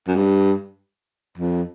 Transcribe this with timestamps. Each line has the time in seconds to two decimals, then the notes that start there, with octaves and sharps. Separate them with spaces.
0.07 F#2
0.16 G2
1.38 F2